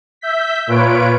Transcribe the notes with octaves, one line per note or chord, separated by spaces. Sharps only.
E5 G6 B6
A#2 F4 B4 C#5 D7